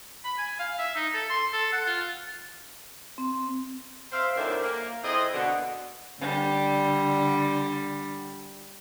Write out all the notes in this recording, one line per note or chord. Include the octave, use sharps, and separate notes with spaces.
B5
G#5
F5
E5
D#4
A4
C6
A4
F#5
F4
C4
C4 C5 E5 F5
F#2 A2 D#3 D4 C5 E5
A#3
F2 C4 E4 G#4 D#5
B2 D3
D3 G3